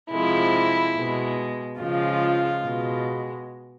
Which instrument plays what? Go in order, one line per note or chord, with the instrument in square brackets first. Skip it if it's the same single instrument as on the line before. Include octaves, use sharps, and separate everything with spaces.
[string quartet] C3 F3 G#3 E4
B2 G#3
C#3 F3 G#3 F4
B2 G#3